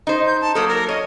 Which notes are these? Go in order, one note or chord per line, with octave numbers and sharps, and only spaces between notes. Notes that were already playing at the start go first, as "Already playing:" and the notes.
D#4 C5
G6
A5
F#3 A#3 A4 D#6
A#4
C#5 D#5